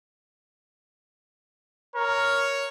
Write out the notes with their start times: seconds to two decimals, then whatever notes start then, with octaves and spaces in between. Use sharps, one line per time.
1.95 A#4 C#5